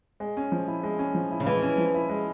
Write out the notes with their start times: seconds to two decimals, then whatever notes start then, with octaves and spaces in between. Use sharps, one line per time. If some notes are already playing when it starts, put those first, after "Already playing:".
0.20 G#3
0.37 C#4
0.52 F3
0.68 E4
0.83 G#3
0.99 C#4
1.15 F3
1.31 E4
1.40 C#3
1.46 E3 G#3
1.62 C#4
1.78 F3
1.94 E4
2.09 G#3